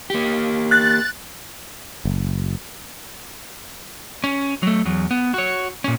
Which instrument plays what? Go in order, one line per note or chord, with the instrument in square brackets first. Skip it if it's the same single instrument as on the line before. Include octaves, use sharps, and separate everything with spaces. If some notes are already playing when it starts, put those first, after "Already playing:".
[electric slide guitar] A#3 G4
[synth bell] F#6 A6
[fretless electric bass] F#1
[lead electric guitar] C#4
F#3 A3
E2 F#3
B3
F#4 C#5
A#2 C#4